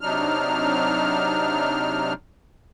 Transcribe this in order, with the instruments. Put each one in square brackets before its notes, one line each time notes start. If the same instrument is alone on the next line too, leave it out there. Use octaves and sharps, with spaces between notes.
[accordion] C3 F#3 D4 D#4 F6